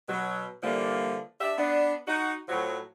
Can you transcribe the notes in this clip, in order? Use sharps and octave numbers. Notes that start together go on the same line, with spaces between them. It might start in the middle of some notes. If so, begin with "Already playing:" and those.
B2 F#3
D3 E3 F3 G3 A#3
D4 G4 E5
B3 D4
D#4 F#4
A2 F3 F#3